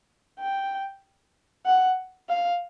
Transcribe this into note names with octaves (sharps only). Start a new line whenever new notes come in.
G5
F#5
F5